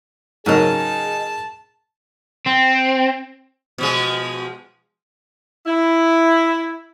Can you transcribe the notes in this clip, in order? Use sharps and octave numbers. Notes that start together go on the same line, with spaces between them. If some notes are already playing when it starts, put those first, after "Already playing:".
G#2 C#3 F#3 D#4 G#4 A#4 A5
C4
B2 F3 G#3
E4